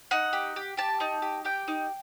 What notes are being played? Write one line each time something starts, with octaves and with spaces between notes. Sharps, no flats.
D#4 F#5
G4
G4
G4 A5
D#4
G4
G4 G5
D#4